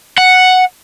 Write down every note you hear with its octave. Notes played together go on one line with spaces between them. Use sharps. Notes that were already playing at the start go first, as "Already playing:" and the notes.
F#5